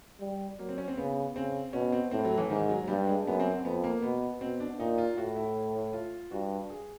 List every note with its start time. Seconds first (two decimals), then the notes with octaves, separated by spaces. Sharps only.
0.20 G3
0.59 F#3 A#3
0.69 C4
0.78 C#4
0.88 C4
0.97 C#3 B3
1.35 C#3 C4
1.73 B2 C#4
1.93 C4
2.11 A2 C4
2.25 F#3
2.38 E3
2.50 G#2 D#3
2.69 F#3
2.84 F#3
2.88 G2 G3
3.07 G#3
3.26 F#2 B3
3.40 C4
3.51 C4
3.65 F2 B3
3.84 A#3
4.02 B2 B3
4.41 B2 C4
4.60 D4
4.79 A#2 D#4
4.98 F4
5.17 A2 F#4
5.36 E4
5.93 F4
6.31 G2 F#4
6.70 G#4